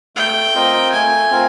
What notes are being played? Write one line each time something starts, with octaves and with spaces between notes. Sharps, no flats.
A3 G5
C4 F4 A#4 D#5
A3 G#5
C4 F4 A#4